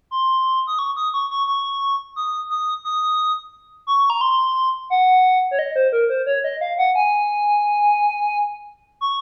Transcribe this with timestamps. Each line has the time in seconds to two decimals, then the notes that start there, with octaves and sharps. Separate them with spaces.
0.11 C6
0.67 D#6
0.79 C#6
0.97 D#6
1.14 C#6
1.31 C#6
1.47 C#6
2.16 D#6
2.50 D#6
2.84 D#6
3.87 C#6
4.10 A#5
4.21 C6
4.90 F#5
5.51 C#5
5.59 D#5
5.76 C5
5.93 A#4
6.10 C5
6.26 C#5
6.44 D#5
6.61 F5
6.78 F#5
6.95 G#5
9.01 C#6